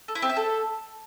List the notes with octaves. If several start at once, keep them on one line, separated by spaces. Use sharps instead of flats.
A4
E4
C4
E5
A4